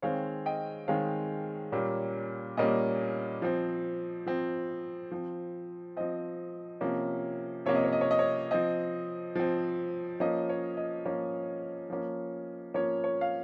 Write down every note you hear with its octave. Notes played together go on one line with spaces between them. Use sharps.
D#3 G#3 C4 C#5 F5
D#5 G5
D#3 G#3 C4 C#5 F5
A#2 G3 A#3 C#4
A#2 G3 A#3 C#4 D#5
F3 C4
F3 C4
F3 C4
F3 C4 D#5
C3 F3 A#3 C#4
C3 F3 A#3 C#4 C#5
D#5
C#5
D#5
C#5
D#5
C#5
F3 C4 D#5
F3 C4
F3 A#3 C#4 D#5
C#5
D#5
F3 A#3 C#4
F3 A#3 C#4
F3 A#3 C#4 C#5
C#5
F5